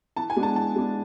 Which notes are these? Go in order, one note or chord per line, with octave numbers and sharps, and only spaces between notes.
E3 A5
G#5
G#3 B3 D4
A5
E3 A5
G#3 B3 D4